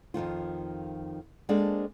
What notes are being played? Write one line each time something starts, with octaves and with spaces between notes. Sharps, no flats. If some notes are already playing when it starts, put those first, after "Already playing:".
F2 G#2 D#3 F4
G#3 A#3 C4 D4 A4